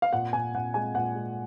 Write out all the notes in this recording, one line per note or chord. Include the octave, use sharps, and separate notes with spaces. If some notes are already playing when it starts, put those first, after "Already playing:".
F5
A#2 F#5
A#2 G#5
A#2 F#5
G#3 G#5
A#2 F#5
G#3